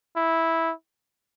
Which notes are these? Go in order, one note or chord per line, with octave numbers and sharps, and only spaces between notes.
E4